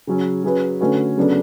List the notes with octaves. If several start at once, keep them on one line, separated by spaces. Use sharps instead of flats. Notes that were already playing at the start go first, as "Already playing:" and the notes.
C#3 F#3 C#4
F#3 C#4 G#4 B4
D3 A3 C#4 F#4 B4
C#3 F#3 B3 D4 A4